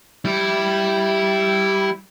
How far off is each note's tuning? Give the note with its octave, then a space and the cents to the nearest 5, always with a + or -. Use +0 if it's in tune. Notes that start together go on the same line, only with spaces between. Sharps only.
G3 -10 E4 +0